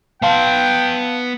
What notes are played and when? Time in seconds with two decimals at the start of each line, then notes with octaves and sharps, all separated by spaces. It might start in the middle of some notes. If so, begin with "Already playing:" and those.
0.22 B3 F5 G5 A5 C6